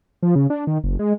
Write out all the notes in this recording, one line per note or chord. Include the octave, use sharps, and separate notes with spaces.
F3
C#3
D4
D#3
F#1
G#3